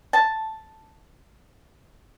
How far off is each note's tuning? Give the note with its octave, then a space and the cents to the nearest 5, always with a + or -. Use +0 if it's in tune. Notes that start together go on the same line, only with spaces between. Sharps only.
A5 +0